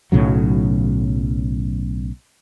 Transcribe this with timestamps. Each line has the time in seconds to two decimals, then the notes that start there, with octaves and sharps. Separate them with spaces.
0.12 B1 A2 C#3 F#3